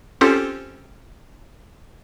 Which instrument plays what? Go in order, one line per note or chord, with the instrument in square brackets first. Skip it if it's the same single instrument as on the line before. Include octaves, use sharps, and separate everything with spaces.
[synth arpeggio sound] C4 C#4 F4 G4 A4 C5